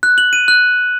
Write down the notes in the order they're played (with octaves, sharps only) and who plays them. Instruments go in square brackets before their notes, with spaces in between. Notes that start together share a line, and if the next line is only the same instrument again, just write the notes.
[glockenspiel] F#6
F#7
D#7
F#6